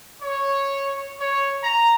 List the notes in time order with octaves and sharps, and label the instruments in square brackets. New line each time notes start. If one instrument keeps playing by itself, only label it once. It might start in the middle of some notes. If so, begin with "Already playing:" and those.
[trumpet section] C#5
C#5
A#5